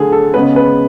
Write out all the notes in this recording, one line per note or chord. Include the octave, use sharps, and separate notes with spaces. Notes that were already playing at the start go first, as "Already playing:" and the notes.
Already playing: D3 A3 G#4
A4
C#3 G#3 B3 B4
B4